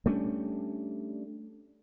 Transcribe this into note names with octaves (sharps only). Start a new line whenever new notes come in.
G3 A3 C#4 D4